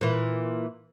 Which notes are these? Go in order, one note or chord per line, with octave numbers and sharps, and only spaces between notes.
A#2 E3